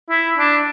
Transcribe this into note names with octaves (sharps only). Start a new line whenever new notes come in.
E4
D4